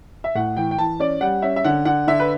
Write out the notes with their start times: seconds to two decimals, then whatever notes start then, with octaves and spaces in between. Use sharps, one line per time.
0.24 E5
0.35 A2 F#5
0.56 E3 G5
0.71 G5
0.78 E3 A5
0.99 C#4 D5
1.21 G3 F#5
1.42 C#4 E5
1.56 E5
1.64 D3 F#5
1.85 D3 F#5
2.07 D3 E5
2.20 B4